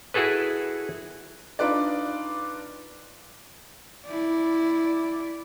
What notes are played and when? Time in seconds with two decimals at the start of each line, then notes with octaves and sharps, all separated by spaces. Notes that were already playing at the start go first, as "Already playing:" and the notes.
0.14 E4 F#4 G#4 A4 B4
1.59 D4 D#4 F4 B4 D5
4.07 E4 D5